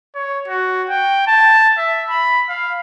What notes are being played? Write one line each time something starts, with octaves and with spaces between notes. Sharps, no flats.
C#5
F#4
G5
A5
E5
B5
F5